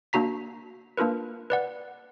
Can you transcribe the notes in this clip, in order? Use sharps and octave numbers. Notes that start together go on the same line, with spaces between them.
A#3 D4 F#4 A#5 B6
A#3 D4 F4 A#4 B4
B4 D5 F#5